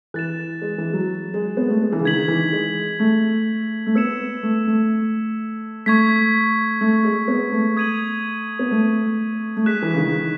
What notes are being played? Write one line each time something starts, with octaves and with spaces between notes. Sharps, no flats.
E3 F#6 A6 E7
G#3
E3
F#3
G#3
B3
A3
G#3
E3
C#3
D#3 G#6 B6 F#7
E3
G#3
A3
A3
B3 E6 G#6 C#7 E7
A3
A3
A3 C#6 G#6 B6
A3
G#3
B3
A3
D#6 G#6 D#7 F#7
B3
A3
A3
G#3 F#6 B6 E7
E3
C#3
D#3